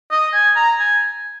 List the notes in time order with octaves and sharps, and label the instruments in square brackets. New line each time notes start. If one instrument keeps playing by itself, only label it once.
[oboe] D#5
G#5
A#5
G#5